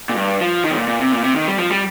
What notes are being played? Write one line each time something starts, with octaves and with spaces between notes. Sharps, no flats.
A#2
G2
F3
D#3
G2
A#2
A#2
C3
A#2
C3
D#3
G3
F3
G3